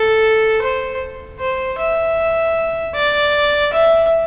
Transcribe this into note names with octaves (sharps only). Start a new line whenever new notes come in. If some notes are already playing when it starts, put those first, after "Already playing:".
Already playing: A4
C5
C5
E5
D5
E5